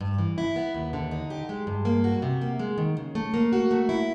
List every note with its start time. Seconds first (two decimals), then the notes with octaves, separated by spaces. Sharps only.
0.01 G2
0.18 E3
0.38 E4
0.56 B3
0.74 D#2
0.93 D3
1.11 D#4
1.30 G4
1.49 G#3
1.67 G2
1.85 A#3
2.04 F#4
2.22 C3
2.41 A#3
2.59 G#3
2.78 D#3
2.97 C#3
3.15 A3
3.34 A#3
3.53 F#4
3.71 A3
3.89 E4